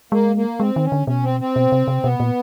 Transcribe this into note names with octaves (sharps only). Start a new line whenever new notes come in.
G#3 A#3
A#3
G#3 C4
D#3
C#4
D3
B2 C#4
C4
C4
B2
C3
C3
B2 B3
A#2